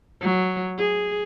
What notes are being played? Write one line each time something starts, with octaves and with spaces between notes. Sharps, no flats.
F#3
G#4